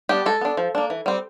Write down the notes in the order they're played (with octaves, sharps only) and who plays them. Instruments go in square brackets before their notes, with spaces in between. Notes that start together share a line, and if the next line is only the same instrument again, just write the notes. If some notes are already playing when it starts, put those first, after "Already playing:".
[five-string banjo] G3 B3 D4 G4
G#3 A4
B3 D4
F3
A#3 D4
E3
G3 C4